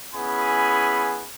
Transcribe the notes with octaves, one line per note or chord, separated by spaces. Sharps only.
B3 C#4 E4 G#4 G#5 B5